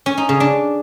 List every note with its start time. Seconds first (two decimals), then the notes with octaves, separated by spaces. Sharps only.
0.06 C#4
0.17 D#4
0.29 C#3
0.40 D4